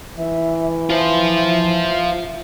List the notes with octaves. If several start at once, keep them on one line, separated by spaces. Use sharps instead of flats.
E3 E5
F4 C5 E5